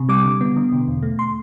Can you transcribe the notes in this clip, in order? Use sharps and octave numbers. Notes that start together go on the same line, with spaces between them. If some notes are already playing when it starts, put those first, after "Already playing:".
Already playing: C3
G3 D6
D3
B3
D3
B2
E2
A3
C6